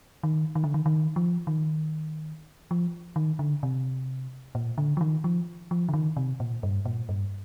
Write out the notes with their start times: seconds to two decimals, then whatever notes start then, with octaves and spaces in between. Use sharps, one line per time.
0.23 D#3
0.55 D#3
0.64 D3
0.74 D#3
0.86 D#3
1.16 F3
1.47 D#3
2.71 F3
3.16 D#3
3.39 D3
3.63 C3
4.55 A#2
4.78 D3
4.97 F3
5.01 D#3
5.24 F3
5.71 F3
5.89 D3
5.94 D#3
6.17 C3
6.40 A#2
6.63 G2
6.85 A#2
7.09 G2